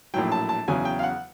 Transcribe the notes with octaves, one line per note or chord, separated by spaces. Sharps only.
A#1 A2 F#3 G5
A5
A5
E2 C#3 F#3 G#5
G5
F5
F#5